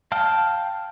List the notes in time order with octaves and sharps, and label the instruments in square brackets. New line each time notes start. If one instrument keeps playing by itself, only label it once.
[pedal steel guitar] F5 G5 A5 F6